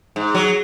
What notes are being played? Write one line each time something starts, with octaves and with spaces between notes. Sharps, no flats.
G#2
F#3